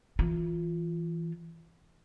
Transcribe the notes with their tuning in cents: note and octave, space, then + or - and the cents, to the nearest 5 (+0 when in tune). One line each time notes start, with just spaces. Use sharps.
E3 +0 F4 +0